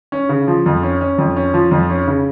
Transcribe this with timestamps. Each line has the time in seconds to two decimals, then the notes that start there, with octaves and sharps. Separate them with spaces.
0.12 C#4
0.29 C#3
0.47 F3
0.66 F2
0.83 C#4
1.01 C#4
1.18 F2
1.36 C#4
1.54 F3
1.71 F2
1.90 C#4
2.07 C#3